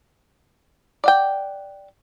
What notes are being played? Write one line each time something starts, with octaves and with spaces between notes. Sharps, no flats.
D5 F#5 G5